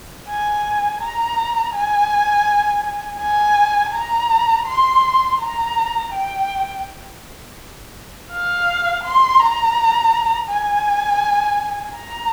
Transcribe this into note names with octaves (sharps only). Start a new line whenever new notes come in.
G#5
A#5
G#5
G#5
A#5
C6
A#5
G5
F5
C6
A#5
G#5
A#5